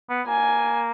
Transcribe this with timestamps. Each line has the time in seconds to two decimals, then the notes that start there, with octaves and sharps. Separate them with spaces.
0.09 B3
0.27 A#3 G#5